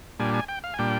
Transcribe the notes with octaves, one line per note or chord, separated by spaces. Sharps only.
A#2 G3 D4 G#5
G#5
G5
F5
G#5
A#2 G3 D4 G5